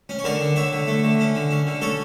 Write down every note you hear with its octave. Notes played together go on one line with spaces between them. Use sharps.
C#4
C#5
D3 A#4 D5
D3
D3 C#5 E5
D3
A3
D3
C#4
D3
C#4
D3
C#4 A4 C#5